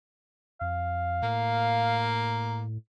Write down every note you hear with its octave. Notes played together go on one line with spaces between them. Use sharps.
F2 F5
A2 A#3